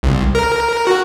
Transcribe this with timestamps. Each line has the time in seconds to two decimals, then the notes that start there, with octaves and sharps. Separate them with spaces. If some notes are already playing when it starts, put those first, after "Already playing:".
0.03 C2
0.35 A#4
0.87 F#4